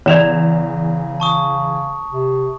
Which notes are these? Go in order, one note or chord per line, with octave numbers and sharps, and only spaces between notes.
E2 C#3 C#5 D5 E7 F7
A5 C#6 D#6
C3